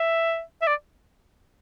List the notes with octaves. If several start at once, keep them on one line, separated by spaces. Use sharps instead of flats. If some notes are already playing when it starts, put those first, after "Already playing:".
Already playing: E5
E5
D5